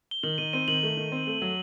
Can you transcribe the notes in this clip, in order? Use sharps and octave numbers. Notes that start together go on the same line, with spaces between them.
G7
D#3 F#7
D#3 D#7
C4 D#7
D#3 F#7
A3
D#3
C4
A3
F#3